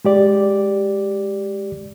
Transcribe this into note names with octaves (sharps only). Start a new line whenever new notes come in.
G#3 G4 D5